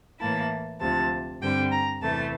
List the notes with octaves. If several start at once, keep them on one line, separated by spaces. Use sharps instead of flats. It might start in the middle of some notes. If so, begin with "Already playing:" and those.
A2 E3 A#3 E4 A5
D2 C3 F3 A5
G2 D3 G3 C4 G5
A#5
E2 C3 E3 A3 A5